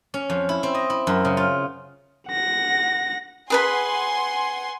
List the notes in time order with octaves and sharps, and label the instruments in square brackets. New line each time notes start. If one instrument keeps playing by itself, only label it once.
[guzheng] C#4
F2
E4
C4
D#5
E4
F#2
C#3
F4
[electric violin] F#5 A#6
[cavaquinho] G#4 B4 B5 [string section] F#5 G#5 C6